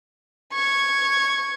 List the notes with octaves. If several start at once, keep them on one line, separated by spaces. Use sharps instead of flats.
C#6 G#6